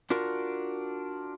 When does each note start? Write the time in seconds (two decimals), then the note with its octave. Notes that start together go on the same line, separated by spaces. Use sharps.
0.10 D4 F4 F#4 A#4